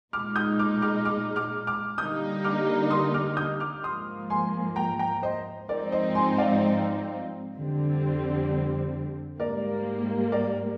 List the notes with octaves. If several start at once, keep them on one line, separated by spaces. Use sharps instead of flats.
A#2 G#3 D#4 D6 F6
D#6 G6
D6 F6
D6 F6
D6 F6
D6 F6
D6 F6
D3 G3 A#3 D#4 D#6 G6
D6 F6
C6 D#6
D6 F6
D#6 G6
D6 F6
G#2 F3 A#3 C6 D#6
G#5 C6
G5 A#5
G5 A#5
C5 D#5
G#2 F3 C4 D#4 A#4 D5
C5 D#5
G#5 C6
D5 F5
F2 D3 G3 C4
G#2 G3 A#3 A#4 D5
A#4 D5